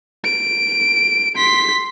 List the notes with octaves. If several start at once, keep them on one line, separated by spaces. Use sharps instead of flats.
D7
C6 B6